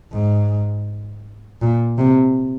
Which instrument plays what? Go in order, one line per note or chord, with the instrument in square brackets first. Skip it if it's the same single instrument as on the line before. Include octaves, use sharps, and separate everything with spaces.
[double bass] G#2
A#2
C3